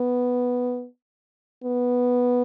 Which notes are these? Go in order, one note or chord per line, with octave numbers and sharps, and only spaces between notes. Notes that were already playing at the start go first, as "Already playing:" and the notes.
Already playing: B3
B3